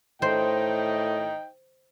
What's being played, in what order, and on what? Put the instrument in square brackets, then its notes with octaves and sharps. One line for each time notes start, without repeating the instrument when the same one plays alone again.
[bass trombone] A2 [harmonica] D#4 D#5 G5 [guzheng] C5